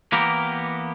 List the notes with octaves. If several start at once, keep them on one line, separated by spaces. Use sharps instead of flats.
E3 A#3 B3 G4 A#4